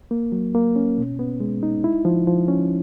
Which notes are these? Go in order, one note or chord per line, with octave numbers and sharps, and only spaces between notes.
A#3
F#3
A#3
C#4
B2
B3
G#3
D#4
E4
F3
F3
C#4